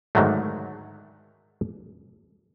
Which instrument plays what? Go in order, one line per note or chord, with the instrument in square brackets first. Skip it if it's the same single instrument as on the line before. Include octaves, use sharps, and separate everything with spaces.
[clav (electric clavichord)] G#2 D3 D#3 F#3 A3